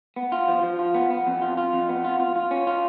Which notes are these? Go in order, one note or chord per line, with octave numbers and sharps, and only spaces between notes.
B3
F4
F3
F3
F4
B3
B3
F2
F4
F4
F2
B3
F4
F4
F4
C#4
F4